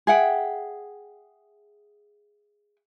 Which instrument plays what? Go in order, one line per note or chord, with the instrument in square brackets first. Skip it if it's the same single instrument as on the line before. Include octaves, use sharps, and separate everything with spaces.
[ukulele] G#4 E5 F#5 G5